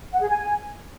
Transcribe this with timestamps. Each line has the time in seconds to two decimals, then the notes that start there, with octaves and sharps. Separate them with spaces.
0.13 F#5
0.20 G#4
0.28 G#5